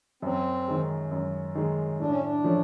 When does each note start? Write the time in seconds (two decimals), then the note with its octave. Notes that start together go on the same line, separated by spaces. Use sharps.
0.22 F#2 C4
0.68 D#3 G#3
1.11 F#2
1.55 D#3 G#3
2.00 A2 D4
2.11 C#4
2.22 D4
2.44 F3 A3 C#4